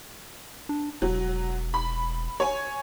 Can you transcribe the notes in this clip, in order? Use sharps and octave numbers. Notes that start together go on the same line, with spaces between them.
D4
E1 F#3
B5
C#5 G#5